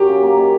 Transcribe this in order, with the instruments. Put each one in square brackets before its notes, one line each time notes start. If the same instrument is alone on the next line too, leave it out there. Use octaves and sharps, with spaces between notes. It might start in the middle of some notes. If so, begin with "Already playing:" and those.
Already playing: [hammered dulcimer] F#2 F#3 [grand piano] G4
[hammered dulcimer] C#3
A#3
D#3